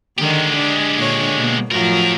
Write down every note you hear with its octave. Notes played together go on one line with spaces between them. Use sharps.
D3 D#3 G#3 G4
D4
A#2 D3 C#5
B2 A#3
F#2 A2 F3 F#3 A#4